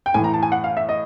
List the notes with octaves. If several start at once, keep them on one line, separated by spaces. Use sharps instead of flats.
G5
A2 E3 G#5
A#5
A5
G#5
F#5
F5
E5
D#5